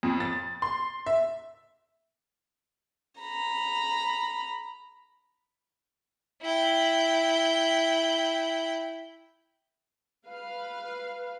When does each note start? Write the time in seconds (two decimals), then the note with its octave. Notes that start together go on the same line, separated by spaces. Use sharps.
0.03 F2
0.20 A6
0.62 C6
1.06 E5
3.20 A#5 B5
6.42 E4 G5
10.27 B4 F5